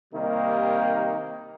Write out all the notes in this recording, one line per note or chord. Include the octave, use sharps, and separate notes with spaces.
C3 D#3 G3 A#3 D#4